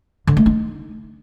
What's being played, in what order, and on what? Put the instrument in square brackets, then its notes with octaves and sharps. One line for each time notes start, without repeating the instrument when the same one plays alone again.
[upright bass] D3
A3
D#4